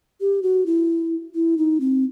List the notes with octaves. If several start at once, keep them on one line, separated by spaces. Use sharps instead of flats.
G4
F#4
E4
E4
D#4
C4